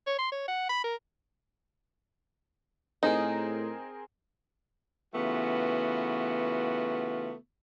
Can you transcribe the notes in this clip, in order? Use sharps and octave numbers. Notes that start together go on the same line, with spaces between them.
C#5
C6
C#5
F#5
B5
A#4
A2 C4 D#4 G#4 A#4
C#3 E3 A3 B3 F4 F#4